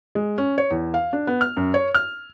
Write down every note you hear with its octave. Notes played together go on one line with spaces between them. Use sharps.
G#3
C#4
C#5
E2
F5
D4
B3
F6
F#2
C#5
F6